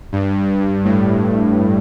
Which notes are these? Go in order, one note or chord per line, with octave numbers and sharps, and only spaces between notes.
G2
A2